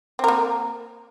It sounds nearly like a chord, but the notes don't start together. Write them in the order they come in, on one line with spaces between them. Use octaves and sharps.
C4 A#4 A#3